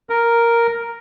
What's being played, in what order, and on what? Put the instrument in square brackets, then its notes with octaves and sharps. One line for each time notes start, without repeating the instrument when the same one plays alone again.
[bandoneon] A#4